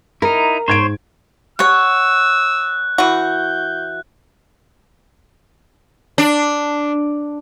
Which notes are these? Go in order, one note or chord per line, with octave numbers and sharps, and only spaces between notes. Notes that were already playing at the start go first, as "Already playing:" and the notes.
D#4 E4 A#4
G#2 C5 C#5 G#6 D7
C#5 F#5 E6 F#6
E3 F#4 G6
D4